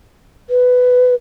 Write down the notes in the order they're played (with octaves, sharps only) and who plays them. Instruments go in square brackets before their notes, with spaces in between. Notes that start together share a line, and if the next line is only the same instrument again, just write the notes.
[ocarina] B4